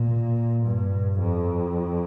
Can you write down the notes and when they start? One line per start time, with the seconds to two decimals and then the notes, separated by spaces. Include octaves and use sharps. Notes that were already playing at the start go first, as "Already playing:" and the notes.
Already playing: A#2
0.66 G2
1.21 F2